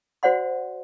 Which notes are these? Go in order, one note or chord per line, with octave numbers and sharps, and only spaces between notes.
F#4 C5 D5 F#5 C6